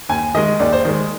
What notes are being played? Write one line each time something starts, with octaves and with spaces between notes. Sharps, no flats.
D#2 G#5
D#3 G#3 D#5
D#2 D5
C5
D#3 G#3